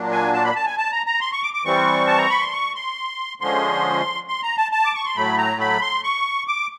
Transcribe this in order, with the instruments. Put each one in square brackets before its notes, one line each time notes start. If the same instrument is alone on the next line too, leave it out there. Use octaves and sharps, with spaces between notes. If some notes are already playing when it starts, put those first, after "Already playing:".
Already playing: [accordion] A#2 F#3 A#3 D4
G#5
A5
B5
A5
G#5
A5
A#5
A#5
C6
C#6
D6
D6
E3 G3 C4 C#6
A5
A#5
B5
C6
C#6
C6
D3 F3 G#3 C#4 C6
C6
A#5
A5
A5
D6
C#6
C6
A2 F#3 A3 B5
A#5
B5
C6
C#6
D6